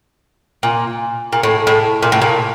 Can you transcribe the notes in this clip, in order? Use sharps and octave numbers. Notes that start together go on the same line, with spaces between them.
A#2
A#2
A2
A2
A#2
A2
A#2